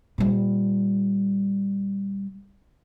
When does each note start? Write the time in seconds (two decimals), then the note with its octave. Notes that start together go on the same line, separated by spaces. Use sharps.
0.18 A#2 G3